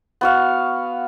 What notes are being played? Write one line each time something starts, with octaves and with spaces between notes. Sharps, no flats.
B3 F#4 F5